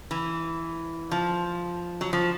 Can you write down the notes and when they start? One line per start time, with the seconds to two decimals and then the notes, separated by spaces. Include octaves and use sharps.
0.11 E3
1.11 F3
2.01 F#3
2.13 F3